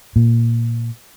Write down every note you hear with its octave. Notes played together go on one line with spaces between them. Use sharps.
A#2